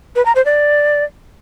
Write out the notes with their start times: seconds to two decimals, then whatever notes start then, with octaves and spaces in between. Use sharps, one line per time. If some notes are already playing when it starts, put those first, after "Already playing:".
0.16 B4
0.25 A#5
0.35 C5
0.45 D5